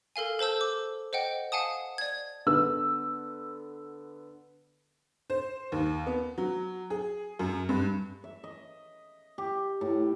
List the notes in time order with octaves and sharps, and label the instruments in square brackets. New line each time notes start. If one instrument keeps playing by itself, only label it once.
[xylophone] A4 A#4 F5 G#5
A4 C5 A5 E6 G6
D6
C5 D#5 F#5 G5
F5 F#5 G#5 A5 D#6
D5 G#6
[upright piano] D3 B3 E6
[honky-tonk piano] C5
D#2
B3
F#3
G#4
F#2
G2
[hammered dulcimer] E5
D#5
G4
A2